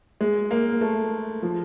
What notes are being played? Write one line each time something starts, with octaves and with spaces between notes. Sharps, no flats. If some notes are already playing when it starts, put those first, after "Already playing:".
G#3
A#3
A3
F3